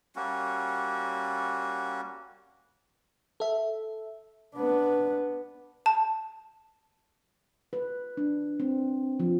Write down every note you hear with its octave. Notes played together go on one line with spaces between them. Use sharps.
G3 A#3 C#4 F#4
A4 E5
B3 D4
A5
B4
D4
C4
F3